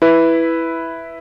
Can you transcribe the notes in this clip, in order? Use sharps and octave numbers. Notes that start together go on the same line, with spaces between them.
E4 B4